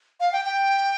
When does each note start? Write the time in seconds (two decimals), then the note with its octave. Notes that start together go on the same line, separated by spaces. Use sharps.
0.20 F5
0.33 G5
0.45 G5